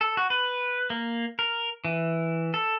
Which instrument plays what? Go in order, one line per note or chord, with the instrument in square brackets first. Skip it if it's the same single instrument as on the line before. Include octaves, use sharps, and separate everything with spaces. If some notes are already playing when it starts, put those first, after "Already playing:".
[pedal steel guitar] A4
F#4
B4
A#3
A#4
E3
A4